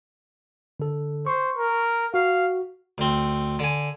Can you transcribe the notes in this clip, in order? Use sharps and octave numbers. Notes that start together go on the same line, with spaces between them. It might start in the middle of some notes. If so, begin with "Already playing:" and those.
D3 A4
C5 C#6
A#4
F#4 F5
D2 C4
D3 G#5